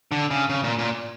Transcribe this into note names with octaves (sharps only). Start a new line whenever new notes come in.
D3
C#3
C#3
A#2
A#2